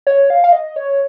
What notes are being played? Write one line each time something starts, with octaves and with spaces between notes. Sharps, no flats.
C#5
F5
F5
D#5
C#5